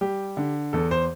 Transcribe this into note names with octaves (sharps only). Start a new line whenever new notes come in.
G3 G4
D3
E2 A4
C5